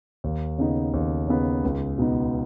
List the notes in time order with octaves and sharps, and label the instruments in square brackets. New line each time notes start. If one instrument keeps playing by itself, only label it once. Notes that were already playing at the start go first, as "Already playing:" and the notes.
[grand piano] D#2
C#3 B3 D#4
D#2
C#3 B3 D#4
C#2
B2 B3 D#4